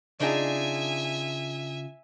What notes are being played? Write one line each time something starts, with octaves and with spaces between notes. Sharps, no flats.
C#3 D4 D#4 F4 G#4 E5 G#5